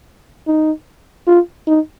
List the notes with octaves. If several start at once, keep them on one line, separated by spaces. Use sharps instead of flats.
D#4
F4
D#4